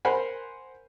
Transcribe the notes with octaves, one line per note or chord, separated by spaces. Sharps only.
A#4 C5 F#5 G#5 B5